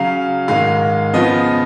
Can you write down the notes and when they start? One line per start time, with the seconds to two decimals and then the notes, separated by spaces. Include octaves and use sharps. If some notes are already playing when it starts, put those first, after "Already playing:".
Already playing: C#3 F#3 C#4 F5
0.48 G#2 D#3 G#3 D#4 F5
1.13 C#3 F3 B3 F4 D#5